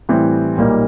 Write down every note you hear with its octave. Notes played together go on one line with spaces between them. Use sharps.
A2 E3 G3 C4
B1 A#2 G3 A#3 D#4